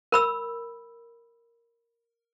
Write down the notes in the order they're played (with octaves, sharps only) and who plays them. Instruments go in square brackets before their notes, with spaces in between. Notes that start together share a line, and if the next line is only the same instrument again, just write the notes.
[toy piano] A#4 B5 E6